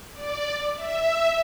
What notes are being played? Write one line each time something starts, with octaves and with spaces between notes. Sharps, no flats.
D5
E5